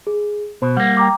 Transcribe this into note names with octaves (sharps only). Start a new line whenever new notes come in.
G#4
B2 C5
G3 A#3 F#5
G5 A#5 D6